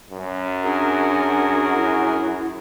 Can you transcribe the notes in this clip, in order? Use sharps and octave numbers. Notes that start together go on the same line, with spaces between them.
F#2
D4 F#4 G#4 A#4
E4